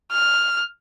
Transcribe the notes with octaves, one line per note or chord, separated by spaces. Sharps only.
F6